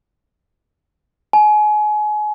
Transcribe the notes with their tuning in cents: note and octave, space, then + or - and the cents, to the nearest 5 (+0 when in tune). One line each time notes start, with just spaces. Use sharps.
G#5 +30